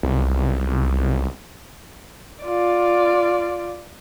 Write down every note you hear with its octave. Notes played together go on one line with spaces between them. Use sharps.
C2
F4 D5